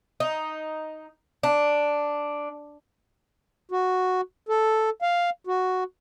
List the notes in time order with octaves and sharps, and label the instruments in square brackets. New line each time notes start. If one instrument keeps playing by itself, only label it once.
[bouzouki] D#4
D4
[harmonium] F#4
A4
F5
F#4